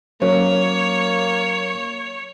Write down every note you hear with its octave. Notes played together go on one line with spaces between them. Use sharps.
F#3 A#3 C#4 C#5